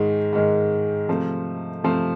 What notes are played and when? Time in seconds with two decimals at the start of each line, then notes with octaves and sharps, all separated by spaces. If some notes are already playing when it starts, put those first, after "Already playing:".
Already playing: G#2 D#3 G#3
0.33 G#2 D#3 G#3
1.08 C3 F3 A3
1.84 C3 F3 A3